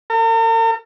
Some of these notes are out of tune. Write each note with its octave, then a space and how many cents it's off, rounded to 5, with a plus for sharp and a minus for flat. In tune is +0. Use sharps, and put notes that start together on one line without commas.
A#4 -45